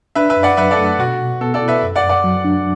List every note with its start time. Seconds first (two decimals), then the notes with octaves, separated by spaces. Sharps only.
0.15 D4 B4 E5
0.30 B4 E5
0.36 F#2
0.43 D5 F#5
0.57 F#3 B4 E5
0.71 A4 D5
0.78 A3
0.85 A4
0.98 B2 F#4
1.20 B2
1.41 B3 A4
1.54 A4 D5
1.61 E4
1.68 B4 E5
1.82 F#2
1.96 D5 F#5
2.03 F#2
2.09 D5 F#5
2.24 F#3
2.45 D4